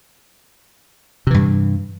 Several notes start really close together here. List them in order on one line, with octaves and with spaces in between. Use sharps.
C3 E3 G2